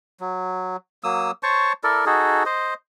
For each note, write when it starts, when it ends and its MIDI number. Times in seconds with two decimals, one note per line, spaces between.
0.20 0.77 54
1.04 1.31 54
1.04 1.31 58
1.04 1.31 87
1.04 1.31 88
1.43 1.73 72
1.43 1.73 73
1.43 1.73 81
1.43 1.73 85
1.84 2.05 64
1.84 2.05 69
1.84 2.05 70
1.84 2.05 74
2.06 2.43 63
2.06 2.43 66
2.06 2.43 68
2.06 2.43 69
2.46 2.74 72
2.46 2.74 75